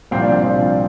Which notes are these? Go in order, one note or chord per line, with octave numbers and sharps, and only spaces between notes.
C2 A#2 F3 C4
D4
C4
C2 A#2 F3 D4